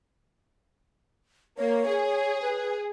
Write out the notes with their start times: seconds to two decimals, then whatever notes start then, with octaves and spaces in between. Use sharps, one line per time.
1.58 A#3 C#5
1.87 G#4
2.42 B4